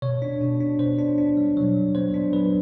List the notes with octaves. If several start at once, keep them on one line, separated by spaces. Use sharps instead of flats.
B2 C#5
D4
B2
D4
B2 C5
D4
D4
G3
F#3 C#5
A#2
B3 C5
D4
F#3 B4